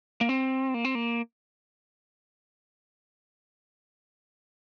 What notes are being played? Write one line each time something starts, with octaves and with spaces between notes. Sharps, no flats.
A#3
C4
A#3
C4
A#3